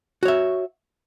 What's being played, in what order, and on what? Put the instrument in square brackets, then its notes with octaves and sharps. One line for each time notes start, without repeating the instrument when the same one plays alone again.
[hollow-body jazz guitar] F#4
C#5
E5